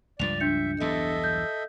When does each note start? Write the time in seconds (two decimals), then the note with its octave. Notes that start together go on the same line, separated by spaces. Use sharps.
0.19 C#2 G2 F3 D5 A6 F7
0.40 D4 E5 G6 C#7
0.80 B1 E2 G2 A4 D#5 E5
1.24 G6